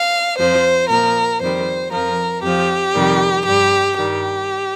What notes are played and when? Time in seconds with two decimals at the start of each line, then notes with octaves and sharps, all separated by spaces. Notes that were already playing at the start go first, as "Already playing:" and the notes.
Already playing: F5
0.38 F2 F3 C5
0.89 A#2 F3 A#4
1.41 F2 D#3 G3 C5
1.92 F2 F3 A#4
2.43 F2 F3 G4
2.95 F2 C3 D#3 G3
3.46 G2 G3 G4
3.97 G2 D#3 G3 G4